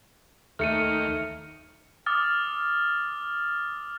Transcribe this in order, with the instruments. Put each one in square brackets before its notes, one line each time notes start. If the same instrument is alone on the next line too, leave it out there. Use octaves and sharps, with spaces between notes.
[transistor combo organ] D#2 [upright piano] A3 [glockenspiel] F6 C#7 D#7
[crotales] D6 D#6 F6 A6